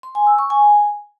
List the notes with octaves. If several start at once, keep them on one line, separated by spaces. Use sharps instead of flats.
C6
G#5
E6
C#6
G#5